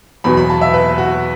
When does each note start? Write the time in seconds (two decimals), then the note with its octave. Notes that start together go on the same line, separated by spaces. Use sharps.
0.24 E2 B2 F#3 B5
0.37 B5
0.50 A5
0.61 E5
0.74 B4
0.98 F#4